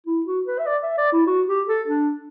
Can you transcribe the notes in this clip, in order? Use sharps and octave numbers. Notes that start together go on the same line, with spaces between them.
E4
F#4
B4
E5
D5
E5
D5
E4
F#4
G4
A4
D4